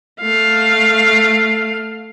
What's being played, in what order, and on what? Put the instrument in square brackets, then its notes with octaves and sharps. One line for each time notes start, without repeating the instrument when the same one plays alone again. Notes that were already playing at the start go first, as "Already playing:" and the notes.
[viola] A3 F5